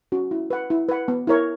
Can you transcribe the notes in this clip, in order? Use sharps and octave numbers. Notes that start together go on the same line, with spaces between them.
C#4 F#4
E4
B4 F#5
E4
B4 F#5
B3
E4 A#4 C#5